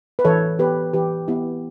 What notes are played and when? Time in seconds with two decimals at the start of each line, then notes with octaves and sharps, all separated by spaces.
0.19 B4
0.25 E3 A4 C#5
0.59 B3 G4 B4
0.93 E3 G4 B4
1.28 B3 E4 G4